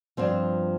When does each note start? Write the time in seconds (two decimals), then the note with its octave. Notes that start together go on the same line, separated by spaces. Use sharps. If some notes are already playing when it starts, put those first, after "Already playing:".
0.17 G2 F3 C4